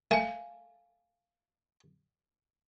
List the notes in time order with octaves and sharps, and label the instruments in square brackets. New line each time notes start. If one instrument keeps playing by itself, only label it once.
[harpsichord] A3 [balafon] F5 G#5